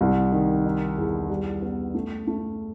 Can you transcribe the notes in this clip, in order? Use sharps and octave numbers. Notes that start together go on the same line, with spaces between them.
C2
D#3
D#4
E2
G3
B3
A3
A3